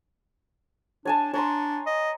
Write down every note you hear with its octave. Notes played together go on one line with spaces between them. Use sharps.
D4 C#5 G#5 A5
D4 C#5 A#5 C6
D#5